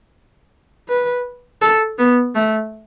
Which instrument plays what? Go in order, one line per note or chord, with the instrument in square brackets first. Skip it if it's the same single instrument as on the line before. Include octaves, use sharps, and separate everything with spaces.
[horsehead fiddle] B4
A4
B3
A3